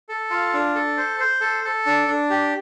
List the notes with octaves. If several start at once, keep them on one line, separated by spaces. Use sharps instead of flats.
A4
F4
D4
A4
C5
C5
A4
A4
D4
D4
G4